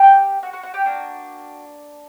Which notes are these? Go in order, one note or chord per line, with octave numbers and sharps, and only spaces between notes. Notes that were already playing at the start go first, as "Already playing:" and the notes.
Already playing: A#3 G4 G5
F#4 F#5
F#4 F#5
F#4 F#5
G4 G5
A#3 D4 F#4